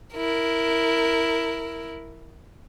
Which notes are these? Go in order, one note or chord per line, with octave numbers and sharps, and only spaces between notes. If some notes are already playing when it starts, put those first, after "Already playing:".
E4 A#4